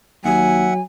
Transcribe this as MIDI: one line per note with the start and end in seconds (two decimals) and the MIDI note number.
0.25 0.70 39
0.25 0.81 54
0.25 0.74 76
0.25 0.74 78
0.25 0.81 80